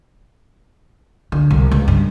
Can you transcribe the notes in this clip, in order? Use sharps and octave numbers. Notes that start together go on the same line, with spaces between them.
D3
C2
C#2
G2